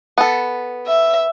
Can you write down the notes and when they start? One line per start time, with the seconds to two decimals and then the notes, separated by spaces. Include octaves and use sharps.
0.18 B3 A4
0.87 E5